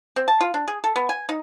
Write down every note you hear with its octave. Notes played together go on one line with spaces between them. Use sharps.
C4
A5
F4
D4
G#4
A4
B3
G#5
D#4